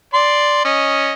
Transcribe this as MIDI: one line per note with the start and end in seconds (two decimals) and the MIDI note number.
0.14 0.60 74
0.14 0.60 84
0.65 1.13 61
0.65 1.13 75